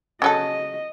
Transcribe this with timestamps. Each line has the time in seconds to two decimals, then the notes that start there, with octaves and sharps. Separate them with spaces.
0.22 C#3 F#3 A4 D#5